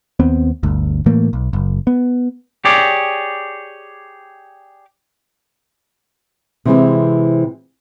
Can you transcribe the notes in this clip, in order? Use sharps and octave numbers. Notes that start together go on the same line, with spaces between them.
D#2 B3 C4
G1 D2
A2 E3 A3 A#3
B1
F#1
B3
G4 G#4 C#5 D5
C3 E3 G#3 C4